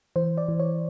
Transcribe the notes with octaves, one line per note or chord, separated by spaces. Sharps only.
E3 C5
D5
E3
C#5